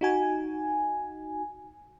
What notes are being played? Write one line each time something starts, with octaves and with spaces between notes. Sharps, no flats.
D#4 F#4 G#5